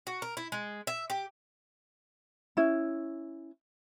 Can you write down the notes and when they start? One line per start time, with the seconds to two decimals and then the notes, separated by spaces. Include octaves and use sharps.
0.07 F#4
0.22 A#4
0.37 E4
0.52 G#3
0.87 E5
1.10 G4
2.57 C#4 E4